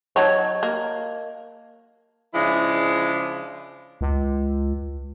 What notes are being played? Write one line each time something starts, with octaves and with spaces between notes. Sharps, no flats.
F#3 D#4 C#5 D#5 A5 G#6
A#3
C#3 F3 G#3 D4 E4
C#2